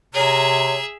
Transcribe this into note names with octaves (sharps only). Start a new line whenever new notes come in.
C3 G#4 C#5 E5 A#5